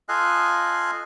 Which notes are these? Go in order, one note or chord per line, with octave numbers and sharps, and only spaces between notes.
F4 A4 D#5 F5 G#5 F#6